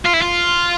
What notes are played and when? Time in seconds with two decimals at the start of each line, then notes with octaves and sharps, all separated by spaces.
0.05 F4
0.14 E4
0.22 F4